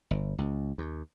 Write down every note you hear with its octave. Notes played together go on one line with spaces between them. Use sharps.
G1
C#2
D#2